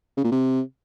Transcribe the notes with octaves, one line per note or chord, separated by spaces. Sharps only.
C#3
A#2
C3